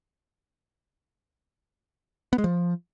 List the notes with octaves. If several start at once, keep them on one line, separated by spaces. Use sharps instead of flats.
B3
G#3
F3